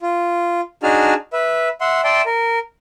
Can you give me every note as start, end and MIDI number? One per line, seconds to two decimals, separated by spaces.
0.01 0.61 65
0.83 1.14 62
0.83 1.14 63
0.83 1.14 66
0.83 1.14 68
0.83 1.14 81
0.83 1.14 89
1.33 1.69 71
1.33 1.69 76
1.81 2.01 76
1.81 2.01 78
1.81 2.01 84
2.04 2.22 74
2.04 2.22 76
2.04 2.22 79
2.04 2.22 81
2.04 2.22 84
2.26 2.59 70